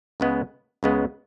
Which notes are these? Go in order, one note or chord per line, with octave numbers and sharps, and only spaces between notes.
C#2 C#3 G#3 B3
C#2 C#3 G#3 B3